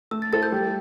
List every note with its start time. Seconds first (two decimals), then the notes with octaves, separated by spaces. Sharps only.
0.11 A3 E6
0.22 A6
0.32 E4 A4 C5 A6
0.43 G6
0.52 G3